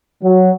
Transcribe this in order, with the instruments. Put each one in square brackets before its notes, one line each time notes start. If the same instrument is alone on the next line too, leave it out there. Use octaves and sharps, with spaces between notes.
[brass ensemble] F#3